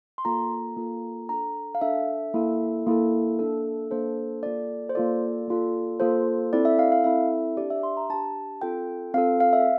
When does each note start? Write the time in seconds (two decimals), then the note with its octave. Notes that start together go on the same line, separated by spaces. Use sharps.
0.18 C6
0.25 A#3 F4 A4 A#5
0.77 A#3 F4 A4
1.29 D4 A4 A#5
1.75 F5
1.81 D4 A4 E5
2.34 A#3 E4 A4
2.87 A#3 E4 A4
3.39 A#3 D4 A4
3.91 A#3 D4 A4 C5
4.43 A#3 F4 A4 D5
4.90 C5
4.95 A#3 F4 A4 D5
5.48 A#3 F4 A4
6.00 A#3 F4 A4 C5
6.53 C4 E4 A4 D5
6.65 E5
6.79 F5
6.92 F5
7.04 C4 E4 A4 E5
7.57 D4 G4 D5
7.70 E5
7.83 C6
7.97 A#5
8.10 D4 G4 A5
8.62 C4 F4 A4 G5
9.14 C4 F4 A4 F5
9.40 F5
9.53 E5